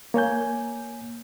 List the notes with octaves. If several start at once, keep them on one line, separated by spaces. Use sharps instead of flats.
A#3 C#5 G#5 G6